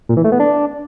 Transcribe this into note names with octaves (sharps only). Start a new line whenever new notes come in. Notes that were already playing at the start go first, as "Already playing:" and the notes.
A#2
E3
A3
B3
D4